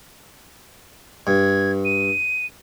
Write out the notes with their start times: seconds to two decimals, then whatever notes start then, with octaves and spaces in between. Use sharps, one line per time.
1.27 G2 G#6
1.85 D#7